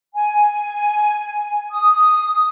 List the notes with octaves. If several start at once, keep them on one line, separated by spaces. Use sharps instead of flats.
G#5
D#6